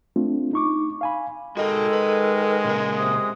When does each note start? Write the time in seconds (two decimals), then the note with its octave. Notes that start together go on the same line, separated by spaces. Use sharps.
0.16 A3 C4 D4 F4
0.53 D#4 C#6 D6
1.01 F5 G#5 B5
1.57 D#3 G#3 F#4 A4 D#5
1.93 B4
2.64 A#2 C#3 A#4
2.98 C3 D#6